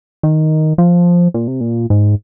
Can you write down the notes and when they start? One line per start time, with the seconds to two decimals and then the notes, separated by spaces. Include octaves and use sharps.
0.23 D#3
0.78 F3
1.34 A#2
1.48 C3
1.61 A#2
1.90 G#2